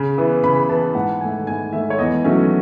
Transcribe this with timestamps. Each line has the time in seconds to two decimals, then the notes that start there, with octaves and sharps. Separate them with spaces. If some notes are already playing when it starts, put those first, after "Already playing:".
Already playing: C#3
0.18 E3 B3
0.43 C#3 B5
0.69 E3 B3 A5
0.95 G#2 F#5
1.21 D#3 A3 G#5
1.47 G#2 G#5
1.73 D#3 A3 E5
1.90 C#5
1.99 E2 D#5
2.24 D#3 F#3 A3 C#4